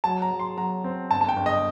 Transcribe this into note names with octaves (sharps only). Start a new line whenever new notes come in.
F#3 A5
A#5
F#3
C6
F#3 A#5
C4
G1 A5
A5
G5
G1
D#5